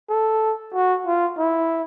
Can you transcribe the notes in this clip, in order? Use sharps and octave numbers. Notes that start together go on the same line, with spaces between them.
A4
F#4
F4
E4